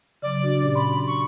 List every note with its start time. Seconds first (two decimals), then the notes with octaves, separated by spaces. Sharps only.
0.22 C#3 F#3 D5
0.43 D4 F#4
0.62 A#2 C#4 G4
0.75 B5 C6
1.07 C#6